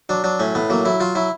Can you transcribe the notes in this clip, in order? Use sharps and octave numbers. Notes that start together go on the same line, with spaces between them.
F#3 D4
F#3 D4
A2 C#4
A2 B3
F#3 A#3
F#3 E4
F#3 F4
F#3 E4